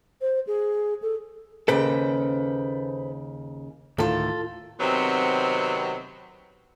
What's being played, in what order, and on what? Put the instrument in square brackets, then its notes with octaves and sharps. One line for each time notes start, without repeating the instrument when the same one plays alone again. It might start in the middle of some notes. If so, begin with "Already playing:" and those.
[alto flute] C5
G#4
A4
[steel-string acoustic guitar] D#2 C#3 G5 [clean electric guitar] A4 B4 C5
[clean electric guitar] D2 A2 D#3 [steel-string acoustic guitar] F4 A4
[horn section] C3 D#3 F#3 B3 C4